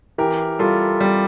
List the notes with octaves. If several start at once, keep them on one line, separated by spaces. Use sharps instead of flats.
E3 G4 A#4
G3 F4 A4
G3